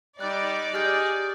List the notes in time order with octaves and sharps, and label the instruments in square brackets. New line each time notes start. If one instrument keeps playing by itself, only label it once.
[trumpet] G3 [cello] D#4 [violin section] D5 [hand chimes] F#6
[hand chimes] G4 F6 G6 [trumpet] G#4